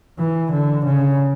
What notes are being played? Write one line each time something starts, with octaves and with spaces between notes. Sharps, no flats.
E3
D3
C#3